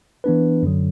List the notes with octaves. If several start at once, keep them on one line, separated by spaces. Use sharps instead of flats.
E3 B3 D4 B4
F#2 D3 F#3